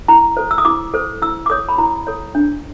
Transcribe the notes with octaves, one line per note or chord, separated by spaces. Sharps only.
E4 A#5
A4 C5
E6
D#6
E4 D6
A4 C5
E4 E6
D6
A4 C#5 D#6
B5
E4 A#5
A4 C#5
D4